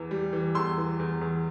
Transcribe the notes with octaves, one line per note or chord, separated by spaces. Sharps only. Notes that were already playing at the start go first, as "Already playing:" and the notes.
Already playing: E2 E3
G3
E3
E2 C6 E6
E3
E2
E2